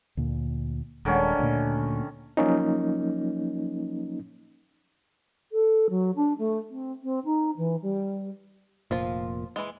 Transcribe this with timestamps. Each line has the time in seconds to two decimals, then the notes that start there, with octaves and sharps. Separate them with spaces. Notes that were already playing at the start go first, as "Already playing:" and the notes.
0.17 D2 A#2
1.05 D#1 D3 D#3 G#3 C#4
1.39 D2 A#2
2.37 F3 F#3 A#3 C#4 D#4
5.52 A4
5.89 F#3
6.16 D4
6.38 A3
6.69 C4
7.03 C4
7.24 D#4
7.57 E3
7.82 G3
8.91 F1 A#2 F3 F4
9.56 E3 G#3